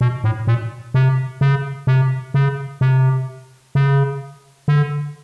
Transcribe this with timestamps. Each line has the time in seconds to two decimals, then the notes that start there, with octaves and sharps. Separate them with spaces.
0.01 B2
0.24 A2
0.47 A#2
0.94 C3
1.41 C#3
1.87 C3
2.34 C#3
2.81 C3
3.75 C#3
4.68 D3